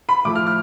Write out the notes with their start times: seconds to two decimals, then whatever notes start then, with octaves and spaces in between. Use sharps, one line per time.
0.09 B5
0.25 A2 F3 A3 D6
0.35 F6
0.47 F6